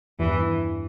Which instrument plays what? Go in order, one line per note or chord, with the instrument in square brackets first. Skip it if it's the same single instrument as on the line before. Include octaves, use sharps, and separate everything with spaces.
[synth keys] E2 G2 [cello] E3